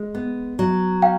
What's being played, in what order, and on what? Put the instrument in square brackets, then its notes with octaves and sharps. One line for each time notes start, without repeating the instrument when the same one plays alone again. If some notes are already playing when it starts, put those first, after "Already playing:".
Already playing: [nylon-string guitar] G#3
B3
F#3
[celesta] F5 G5